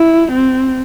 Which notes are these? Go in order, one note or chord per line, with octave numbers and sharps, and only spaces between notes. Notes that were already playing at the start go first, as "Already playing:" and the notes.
Already playing: E4
C4